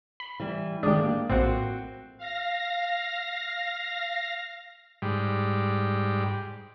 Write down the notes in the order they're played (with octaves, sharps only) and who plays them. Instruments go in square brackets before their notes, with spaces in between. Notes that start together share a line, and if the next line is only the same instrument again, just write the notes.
[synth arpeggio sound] B5
[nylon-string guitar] E3 G3
[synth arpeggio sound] D#3 D#6 [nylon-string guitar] G#3 G4 [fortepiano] D4
[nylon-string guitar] A#3
[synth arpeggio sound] A#1 A2 [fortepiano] C4 F#4
[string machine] F5 A#6
[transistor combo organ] G#2 G3